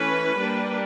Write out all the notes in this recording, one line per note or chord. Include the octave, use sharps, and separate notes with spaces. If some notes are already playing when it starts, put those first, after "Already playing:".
Already playing: E3 A3 C#4 B4
G3 A#3 D4